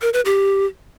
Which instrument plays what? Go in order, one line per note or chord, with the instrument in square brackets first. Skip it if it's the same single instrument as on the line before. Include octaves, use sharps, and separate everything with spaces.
[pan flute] A#4
B4
G4